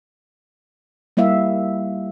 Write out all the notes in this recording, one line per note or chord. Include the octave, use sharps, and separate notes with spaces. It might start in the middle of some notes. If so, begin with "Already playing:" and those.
G3 A#3 E4 E5 F5